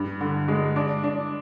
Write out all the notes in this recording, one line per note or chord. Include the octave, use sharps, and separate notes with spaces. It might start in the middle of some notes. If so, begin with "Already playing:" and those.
Already playing: G2
D3
G#3
D4
D4